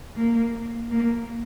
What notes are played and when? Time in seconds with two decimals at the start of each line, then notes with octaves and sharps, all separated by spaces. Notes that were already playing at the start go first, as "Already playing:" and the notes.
0.14 A#3
0.90 A#3